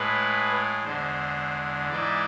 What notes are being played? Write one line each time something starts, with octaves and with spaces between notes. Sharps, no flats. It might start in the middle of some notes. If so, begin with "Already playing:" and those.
Already playing: A2 G#3 B4
E2 D3 G#3 C5
G#2 E3 G#3 D5